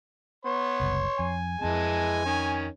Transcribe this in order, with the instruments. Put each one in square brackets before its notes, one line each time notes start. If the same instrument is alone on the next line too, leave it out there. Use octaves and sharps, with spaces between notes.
[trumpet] B3 [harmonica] C#5 C6
[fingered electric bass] F#1 C2
[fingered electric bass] F2 [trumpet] G#5
[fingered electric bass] F2 C4 [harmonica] E3 G#3 A5
[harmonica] D#3 C#4